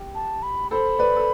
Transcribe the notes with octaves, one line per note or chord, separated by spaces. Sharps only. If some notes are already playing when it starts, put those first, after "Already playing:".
Already playing: G4
A5
B5
A4 C5 B5
B4 D5
A4